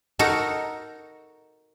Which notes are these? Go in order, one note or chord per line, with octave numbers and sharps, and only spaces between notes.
D#4 F#4 A4 A#4 A#5